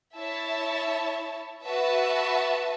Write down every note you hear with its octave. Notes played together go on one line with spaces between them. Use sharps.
E4 C#5 E5 A5
F#4 B4 E5 A5